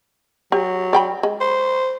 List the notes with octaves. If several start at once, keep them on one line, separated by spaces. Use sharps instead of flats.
F#3 G4
D5 G5 B5
G#3
C5